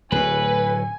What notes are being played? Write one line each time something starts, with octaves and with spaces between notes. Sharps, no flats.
D1 A2 B4 G#5